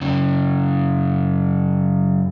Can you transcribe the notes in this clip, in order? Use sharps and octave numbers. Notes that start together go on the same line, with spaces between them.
F#2 C#3